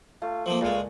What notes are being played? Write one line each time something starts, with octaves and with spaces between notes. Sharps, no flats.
A3 F4
F3 A#3 C4
C#2 A#2 G#3 F4